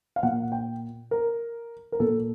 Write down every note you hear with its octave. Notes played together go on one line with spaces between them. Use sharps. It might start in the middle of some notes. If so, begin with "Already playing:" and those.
F5
A#2 F#5
G5
A#4
A#4
A#2 A4